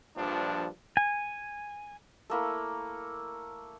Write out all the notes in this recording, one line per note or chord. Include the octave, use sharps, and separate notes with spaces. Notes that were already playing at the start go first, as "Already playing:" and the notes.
A#1 G2 F3 D4
G#5
A3 A#3 E4